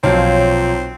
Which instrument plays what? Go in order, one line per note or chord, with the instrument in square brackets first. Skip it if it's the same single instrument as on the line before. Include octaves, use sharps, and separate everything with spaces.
[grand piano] B1 [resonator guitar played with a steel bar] A#2 F3 F4 [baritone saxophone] C4 [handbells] C#5